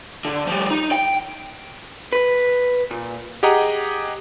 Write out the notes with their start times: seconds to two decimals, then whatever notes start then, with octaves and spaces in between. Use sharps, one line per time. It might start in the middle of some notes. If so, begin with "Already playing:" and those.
0.25 D3
0.47 F3 G3
0.70 D#4
0.92 G5
2.13 B4
2.91 A#2
3.43 G4 G#4 D#5 F#5 A#5